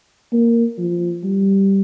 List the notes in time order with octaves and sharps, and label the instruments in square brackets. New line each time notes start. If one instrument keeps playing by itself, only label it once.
[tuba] A#3
F3
G3